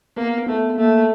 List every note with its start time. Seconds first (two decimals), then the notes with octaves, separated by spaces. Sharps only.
0.16 A#3 B3
0.47 A3 B3
0.78 A3 A#3